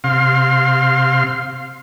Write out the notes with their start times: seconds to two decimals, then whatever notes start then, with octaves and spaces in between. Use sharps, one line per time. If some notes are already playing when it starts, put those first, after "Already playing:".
0.04 C3 F5 C6